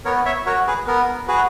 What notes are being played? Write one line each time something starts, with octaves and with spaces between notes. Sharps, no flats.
B3 A#4 C#5
C#5 E5
F#4 A#4 C#5
G#4 B4
B3 A#4
F#4 G#4 B4